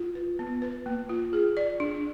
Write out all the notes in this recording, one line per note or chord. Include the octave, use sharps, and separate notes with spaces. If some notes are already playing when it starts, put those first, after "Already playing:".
Already playing: F4
B4
B3
B4
A#3
F4
G#4
D5
D4